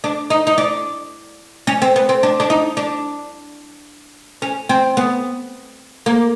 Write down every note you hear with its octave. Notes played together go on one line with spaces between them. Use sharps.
D4
D#4
D#4
D4
C#4
C4
B3
C4
D4
D4
D#4
D4
C#4
C4
B3
A#3